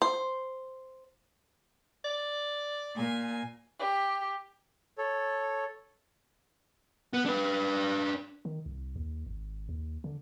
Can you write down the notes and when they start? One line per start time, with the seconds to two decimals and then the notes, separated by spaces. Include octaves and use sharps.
0.02 C5
2.04 D5
2.96 A#2 G#5
3.78 G4
4.98 A4 C#5
7.14 B3
7.26 D4 B4
8.45 D#3
8.66 C2
8.96 D#2
9.26 G#1
9.69 D#2
10.04 D3